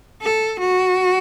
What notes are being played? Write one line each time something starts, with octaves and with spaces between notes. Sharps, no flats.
A4
F#4